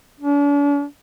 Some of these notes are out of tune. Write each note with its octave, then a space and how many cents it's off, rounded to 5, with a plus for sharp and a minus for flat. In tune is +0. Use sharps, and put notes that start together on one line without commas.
D4 -45